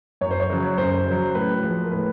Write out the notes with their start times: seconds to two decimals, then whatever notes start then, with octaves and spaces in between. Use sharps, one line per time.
0.21 F#2 C#5
0.31 C5
0.40 C#5
0.50 C#3 F#3
0.78 F#2 C5
1.06 C#3 F#3
1.35 A2 B4
1.63 F3 G#3
1.83 A#4
1.91 A2 B4